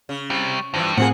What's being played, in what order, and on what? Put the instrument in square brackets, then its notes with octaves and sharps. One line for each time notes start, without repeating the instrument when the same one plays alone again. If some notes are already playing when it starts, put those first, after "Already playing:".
[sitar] C#3
[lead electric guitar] G3 C4
[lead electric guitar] G2 [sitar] E3 F3
[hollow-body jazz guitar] A2 C4 G#4 [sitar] F3 A#3 [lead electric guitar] F#5